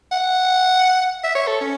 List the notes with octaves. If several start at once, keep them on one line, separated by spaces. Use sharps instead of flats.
F#5
E5
C#5
A4
C#4